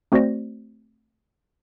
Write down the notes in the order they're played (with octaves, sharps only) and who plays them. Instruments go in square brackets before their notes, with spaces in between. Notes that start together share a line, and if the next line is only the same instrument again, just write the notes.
[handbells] A3 C4 F#4 C5 D5 A#6